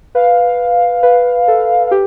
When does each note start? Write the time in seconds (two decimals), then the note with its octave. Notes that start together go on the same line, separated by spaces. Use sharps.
0.15 B4 F5
1.03 B4
1.48 A4
1.87 F5
1.91 G4